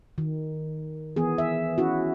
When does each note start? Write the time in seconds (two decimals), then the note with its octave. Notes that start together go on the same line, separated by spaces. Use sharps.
0.18 D#3
1.16 E3 B3 G#4
1.38 E5
1.78 C#4 E4 F#4